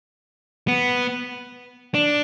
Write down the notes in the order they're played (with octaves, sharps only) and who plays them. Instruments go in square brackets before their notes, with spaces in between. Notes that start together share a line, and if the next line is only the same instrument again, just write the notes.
[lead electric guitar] B3
D4